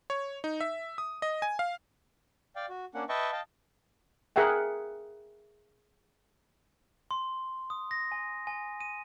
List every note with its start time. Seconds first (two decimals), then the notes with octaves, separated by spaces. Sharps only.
0.10 C#5
0.44 D#4
0.61 E5
0.98 D#6
1.22 D#5
1.42 G#5
1.59 F5
2.56 D5 F5 G5
2.69 F#4
2.94 A#3 C#4 D4 F#5
3.09 B4 D#5 E5 G5 A5 C#6
3.32 D#5 F5 G5 A5
4.36 G#4 A#4 E5 F#5 G5
7.11 C6
7.70 D#6
7.91 A#6
8.12 G#5
8.47 G#5
8.80 D#7